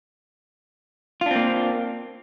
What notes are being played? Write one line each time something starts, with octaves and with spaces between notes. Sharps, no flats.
A#3 C4 D4 F4